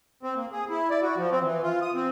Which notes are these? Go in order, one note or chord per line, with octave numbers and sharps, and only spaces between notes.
C4
A#3
G#4
E4
D5
F#4
F3
C4
E3
F4
D#6
C4